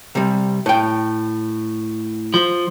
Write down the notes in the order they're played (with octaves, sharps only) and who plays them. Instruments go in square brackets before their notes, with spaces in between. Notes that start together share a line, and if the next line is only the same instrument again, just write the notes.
[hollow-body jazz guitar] C3 G3
A2 G5
[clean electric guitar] F3